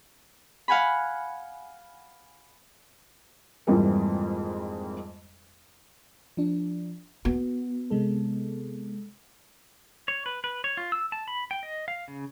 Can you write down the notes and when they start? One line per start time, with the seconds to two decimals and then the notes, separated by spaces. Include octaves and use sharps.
0.68 F5 F#5 G#5 B5
3.67 F2 G#2 E3 G3 A#3
6.37 F3 D4
7.25 B3 F#4
7.90 C3 G#3 A4
10.08 C#5
10.26 B4
10.44 B4
10.64 C#5
10.77 F4
10.92 E6
11.12 A5
11.28 B5
11.51 G5
11.63 D#5
11.88 F5
12.08 C#3